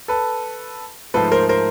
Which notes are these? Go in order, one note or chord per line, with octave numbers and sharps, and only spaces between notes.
A4 B4
G#2 F3 A3 A4 B4
A#4 C5
A#4 C5